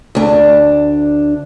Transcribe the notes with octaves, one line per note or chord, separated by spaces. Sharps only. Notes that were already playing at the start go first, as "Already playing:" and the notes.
D2 D4